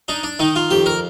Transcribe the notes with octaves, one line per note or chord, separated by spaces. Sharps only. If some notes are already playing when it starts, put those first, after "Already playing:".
D4 D#4
D4
D#3 D#4
F4
F2 G4
A#4